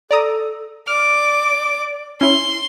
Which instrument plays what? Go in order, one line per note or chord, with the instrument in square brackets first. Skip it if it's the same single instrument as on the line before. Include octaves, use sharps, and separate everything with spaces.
[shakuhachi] A4 [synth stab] D5 A#5 D#6
[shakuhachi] D5 [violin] D6 [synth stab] F6
[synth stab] C#4 E4 [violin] C6